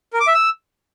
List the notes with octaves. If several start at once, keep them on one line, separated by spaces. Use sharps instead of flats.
A#4
D6
E5
E6